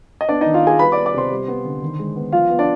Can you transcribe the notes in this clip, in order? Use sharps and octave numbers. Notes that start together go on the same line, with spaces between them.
D#5
B3 D4 D5
D#3 D#4 D#5
F4 F5
B3 G#4 G#5
G3 B4 B5
D5 D6
B3
D5 D6
C3 C5 C6
G3
B3
D3
D#3
G#3
B3
F3 F4 F5
B3
D4 D5